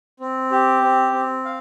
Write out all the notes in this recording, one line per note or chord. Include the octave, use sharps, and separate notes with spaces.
C4
G4
C4
C4
F5